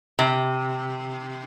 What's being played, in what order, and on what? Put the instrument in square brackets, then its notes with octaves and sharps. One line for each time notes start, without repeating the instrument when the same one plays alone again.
[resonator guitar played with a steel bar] C3